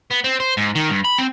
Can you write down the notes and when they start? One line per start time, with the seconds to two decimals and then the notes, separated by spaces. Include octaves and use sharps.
0.11 B3
0.24 C4
0.40 C5
0.57 G#2
0.75 D#3
0.89 G2
1.05 B5
1.18 C4